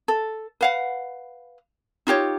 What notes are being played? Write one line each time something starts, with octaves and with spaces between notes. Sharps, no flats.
A4
B4 F5 F#5
D#4 F4 G4 C#5